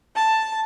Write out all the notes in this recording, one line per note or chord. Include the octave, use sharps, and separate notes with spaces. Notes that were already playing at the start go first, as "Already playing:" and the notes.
A5